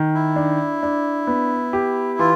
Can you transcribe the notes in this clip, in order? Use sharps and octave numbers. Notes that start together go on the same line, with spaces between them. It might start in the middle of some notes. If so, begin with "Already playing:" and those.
Already playing: D#3
E4
D4
D4
B3
G4
E3 F4